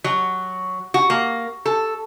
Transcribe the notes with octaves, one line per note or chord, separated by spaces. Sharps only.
F#3
F#4
A#3
A4